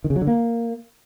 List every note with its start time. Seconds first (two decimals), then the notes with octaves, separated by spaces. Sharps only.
0.04 D#3
0.10 C#3
0.16 F#3
0.21 D3
0.27 A#3